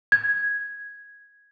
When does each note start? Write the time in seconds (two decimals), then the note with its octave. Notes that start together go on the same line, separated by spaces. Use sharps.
0.12 G#6